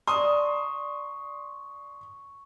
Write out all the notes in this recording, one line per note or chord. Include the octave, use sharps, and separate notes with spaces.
D5 A5 A#5 C6 C#6 D#6